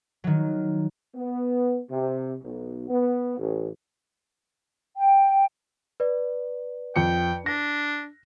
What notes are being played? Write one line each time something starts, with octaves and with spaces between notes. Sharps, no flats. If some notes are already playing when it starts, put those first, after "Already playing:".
D#3 F#3
B3
C3
B1
B3
A1
G5
B4 D5
F2 G5 C#7
D4 A#6